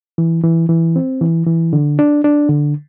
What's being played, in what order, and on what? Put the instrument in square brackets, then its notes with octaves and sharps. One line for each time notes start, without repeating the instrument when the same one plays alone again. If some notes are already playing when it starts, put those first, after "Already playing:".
[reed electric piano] E3
E3
E3
C4
E3
E3
D3
D4
D4
D3